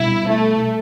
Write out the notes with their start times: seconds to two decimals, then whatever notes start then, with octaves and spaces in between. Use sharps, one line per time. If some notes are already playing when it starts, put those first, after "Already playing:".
Already playing: B2 G3 D4 E4
0.30 A3